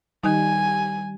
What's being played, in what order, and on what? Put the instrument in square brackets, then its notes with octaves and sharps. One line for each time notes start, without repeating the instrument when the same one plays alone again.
[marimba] D#3 D#4 [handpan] G3 [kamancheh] G#5